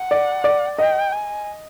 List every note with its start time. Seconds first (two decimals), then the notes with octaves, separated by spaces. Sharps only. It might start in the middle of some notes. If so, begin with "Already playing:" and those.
Already playing: F#5
0.11 D5
0.44 D5
0.78 D#5 G5
1.12 G#5